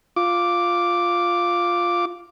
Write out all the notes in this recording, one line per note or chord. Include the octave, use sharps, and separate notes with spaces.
F4 D6